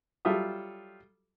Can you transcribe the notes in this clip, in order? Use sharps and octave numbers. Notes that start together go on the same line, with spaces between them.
F#3 G3 F4 A4 E5 D#6